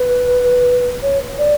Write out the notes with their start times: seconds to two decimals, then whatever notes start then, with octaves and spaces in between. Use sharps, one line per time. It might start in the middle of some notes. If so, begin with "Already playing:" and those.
Already playing: B4
1.02 C#5
1.38 D5